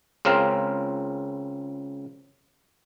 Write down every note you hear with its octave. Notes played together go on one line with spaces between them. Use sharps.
C#2 C#3 C4 A#4 F5